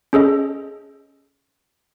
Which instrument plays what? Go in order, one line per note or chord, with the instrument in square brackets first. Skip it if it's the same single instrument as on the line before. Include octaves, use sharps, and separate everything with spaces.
[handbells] C#4 G#4 A4 D#5